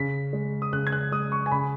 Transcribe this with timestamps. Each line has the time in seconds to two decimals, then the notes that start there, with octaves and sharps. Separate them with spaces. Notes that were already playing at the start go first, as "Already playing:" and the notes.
Already playing: C#3 B6
0.33 G#3
0.62 D#6
0.73 C#3 F#6
0.87 G#6
0.92 F#6
1.12 G#3 D#6
1.32 C#6
1.46 G#5
1.51 C#3 B5